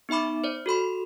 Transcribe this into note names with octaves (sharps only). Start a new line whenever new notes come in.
B3 D#4 E5 B5 D6
C5 D5
F#4 A4 B5 C6